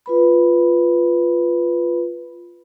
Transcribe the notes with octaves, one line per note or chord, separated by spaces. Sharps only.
F4 B4 B5